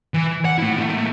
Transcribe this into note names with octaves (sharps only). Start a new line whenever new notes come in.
E3
F#5
A3 E4
A3 A#3